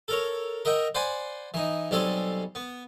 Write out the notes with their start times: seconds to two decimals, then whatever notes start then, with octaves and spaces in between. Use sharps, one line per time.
0.08 A4 A#4 C#5
0.65 A#4 D#5 E5 F#5 G5
0.95 C5 D5 F#5 G#5 B5 C6
1.54 E3 D#4
1.91 B1 G3 C4 A4 G#5 C6
2.55 B3